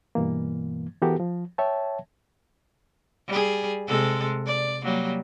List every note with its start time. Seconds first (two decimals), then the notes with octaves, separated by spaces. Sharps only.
0.15 G2 B2 E3 A#3
1.02 E3 B3 F#4 G4 A4 A#4
1.20 F3
1.58 C#5 E5 G5 A5
3.28 G3 G#4
3.88 C3 G#3 A4
4.46 D5
4.84 F#3 G3 A#3